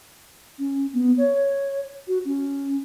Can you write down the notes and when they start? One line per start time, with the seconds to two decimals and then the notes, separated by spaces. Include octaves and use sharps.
0.59 C#4
0.93 B3
1.18 C#5
2.08 F#4
2.25 C#4